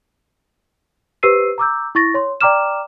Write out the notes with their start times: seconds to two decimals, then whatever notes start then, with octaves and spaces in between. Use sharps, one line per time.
1.23 G4 B4 C5 E6 C7 D#7
1.58 A#5 D6 E6 G6
1.95 E4 C#6 A6 A#6
2.14 C#5 C6
2.41 D5 G5 A#5 D6 F6 E7